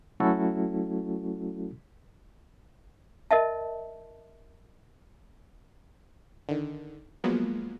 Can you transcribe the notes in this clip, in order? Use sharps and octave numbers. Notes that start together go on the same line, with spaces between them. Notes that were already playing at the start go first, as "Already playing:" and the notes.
F#3 A3 C#4 E4 F#4 A4
A#4 D#5 E5 A5
D3 D#3
F3 F#3 G#3 A#3 B3